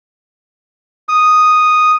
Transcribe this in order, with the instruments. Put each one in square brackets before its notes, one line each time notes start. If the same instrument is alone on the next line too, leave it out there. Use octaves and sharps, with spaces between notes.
[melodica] D#6